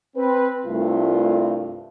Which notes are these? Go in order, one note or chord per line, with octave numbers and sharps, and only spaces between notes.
C4 B4
C2 G2 A3 F4